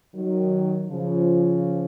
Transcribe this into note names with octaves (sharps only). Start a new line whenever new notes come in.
D#3 F#3
C#3 F3